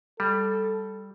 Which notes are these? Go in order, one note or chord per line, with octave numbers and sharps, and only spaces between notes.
G3 A4